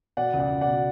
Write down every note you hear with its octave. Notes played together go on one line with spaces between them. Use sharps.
B2 D5 F#5
C#2
D5 F#5
C#2
D5 F#5
B2